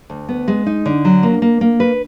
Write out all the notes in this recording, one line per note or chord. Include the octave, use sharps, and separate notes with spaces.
D2
B3
G#3
D#4
D3
F#3
A#3
A#3
A#3
B4